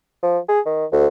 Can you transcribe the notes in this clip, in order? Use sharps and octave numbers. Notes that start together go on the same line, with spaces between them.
F3
G#4
D#3
D2